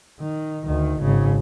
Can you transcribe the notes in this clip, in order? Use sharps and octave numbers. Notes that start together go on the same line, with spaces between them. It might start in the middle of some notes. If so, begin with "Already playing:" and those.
D#3
D2 D#3
G#1 C#3